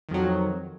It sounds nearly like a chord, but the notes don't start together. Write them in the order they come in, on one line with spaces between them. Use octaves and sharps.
D#3 F2 F#3